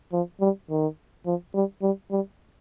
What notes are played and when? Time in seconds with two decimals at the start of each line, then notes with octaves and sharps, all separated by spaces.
0.13 F3
0.41 G3
0.70 D#3
1.26 F3
1.54 G3
1.82 G3
2.11 G3